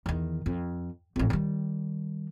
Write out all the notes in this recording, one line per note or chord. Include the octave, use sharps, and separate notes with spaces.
E2 D#3
F2
A1 F2
D#3 G3